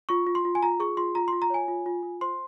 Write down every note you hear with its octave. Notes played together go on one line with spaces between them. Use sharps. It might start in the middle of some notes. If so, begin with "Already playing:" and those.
F4 C#6
F4
C6
F4
G#5
F4 A#5
G#4 C#6
F4 C6
F4 A#5
F4 C6
A#5
C#5 G#5
F4
F4
F4
C5 C6